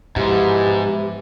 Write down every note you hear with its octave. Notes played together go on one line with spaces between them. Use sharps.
G#2 B2 E3 F3 G4